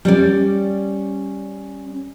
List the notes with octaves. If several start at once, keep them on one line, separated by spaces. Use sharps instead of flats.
G3 C#4 D5